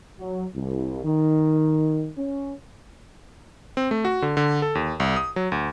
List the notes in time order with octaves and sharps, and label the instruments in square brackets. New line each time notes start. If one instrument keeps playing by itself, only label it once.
[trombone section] F#3
C2
D#3
C#4
[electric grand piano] C4
A3
F#4
D3
D3
A4
D#2
C2
D#6
F#3
D2